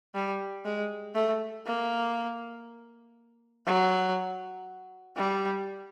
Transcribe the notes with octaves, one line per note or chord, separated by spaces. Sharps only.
G3
G#3
A3
A#3
F#3
G3